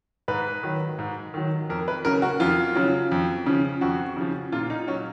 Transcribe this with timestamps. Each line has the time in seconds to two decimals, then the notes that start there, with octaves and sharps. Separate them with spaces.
0.28 G#2 B4
0.63 D#3 F#3
0.99 G#2
1.34 D#3 F#3
1.69 F2 A#4
1.88 B4
2.05 C#3 F#3 A#4
2.22 F#4
2.40 F2 F4
2.75 C#3 F#3
3.12 F2
3.46 C#3 F3
3.81 F2 F#4
4.17 C#3 F3
4.52 A#2 F4
4.70 D#4
4.88 F#3 C#4